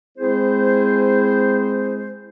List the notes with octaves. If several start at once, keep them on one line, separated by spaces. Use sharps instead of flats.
G#3 C4 E4 G#4 C5